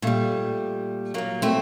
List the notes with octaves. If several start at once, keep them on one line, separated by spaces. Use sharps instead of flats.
A#2 G3 A3
A#2 F#3 A#3
A3 C4